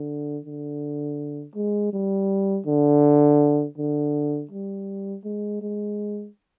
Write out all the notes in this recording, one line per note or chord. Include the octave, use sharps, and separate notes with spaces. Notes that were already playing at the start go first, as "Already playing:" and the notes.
Already playing: D3
D3
G#3
G3
D3
D3
G3
G#3
G#3